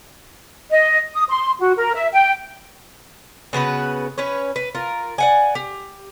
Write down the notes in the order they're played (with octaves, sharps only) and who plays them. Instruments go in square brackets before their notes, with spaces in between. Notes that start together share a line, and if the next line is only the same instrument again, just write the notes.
[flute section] D#5
D#6
C6
F#4
A#4
E5
G5
[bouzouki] C#3 B3 F#4 B4
C#4 B4 C#5
B4
F4 A#4
D5 F#5 G#5
G4